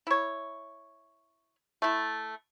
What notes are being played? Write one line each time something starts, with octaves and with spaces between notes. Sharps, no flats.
E4 C#5
A3 E4